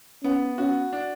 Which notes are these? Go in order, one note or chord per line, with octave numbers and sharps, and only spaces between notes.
B3 C#4
C#4 F#4
D4